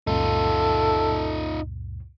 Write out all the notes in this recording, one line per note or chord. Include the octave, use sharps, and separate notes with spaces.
C#2 F#2 A#2 D#4 F4 A4